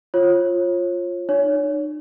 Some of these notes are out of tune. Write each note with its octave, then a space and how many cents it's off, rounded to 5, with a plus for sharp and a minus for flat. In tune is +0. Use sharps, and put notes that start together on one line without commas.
F4 +0 C#5 -35
D#4 -45 C#5 +25